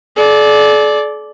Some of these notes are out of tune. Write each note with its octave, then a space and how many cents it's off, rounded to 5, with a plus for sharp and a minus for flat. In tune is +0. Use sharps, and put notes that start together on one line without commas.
A4 -45 D5 +0